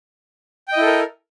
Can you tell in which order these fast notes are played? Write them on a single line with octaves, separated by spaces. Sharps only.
G5 D#5 E4 A4 A#4